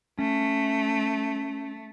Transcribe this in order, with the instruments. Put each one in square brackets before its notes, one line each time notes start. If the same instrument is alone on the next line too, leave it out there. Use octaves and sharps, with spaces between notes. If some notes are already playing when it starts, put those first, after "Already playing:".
[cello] A3 [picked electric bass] C#4